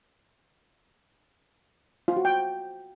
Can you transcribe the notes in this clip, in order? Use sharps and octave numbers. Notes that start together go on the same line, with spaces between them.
F4
F#4
G5